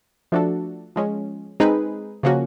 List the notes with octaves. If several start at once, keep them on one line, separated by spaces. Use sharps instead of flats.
F3 A3 D4 F#4 A4
F3 G#3 C#4
G#3 C4 D#4 G#4 B4
C#3 F3 A#3 C#4 F#4